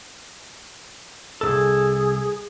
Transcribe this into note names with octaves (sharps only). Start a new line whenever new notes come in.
C2 G#2 G#4 A4